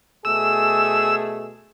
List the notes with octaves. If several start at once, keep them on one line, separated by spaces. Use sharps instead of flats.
B2 A3 G#4 E6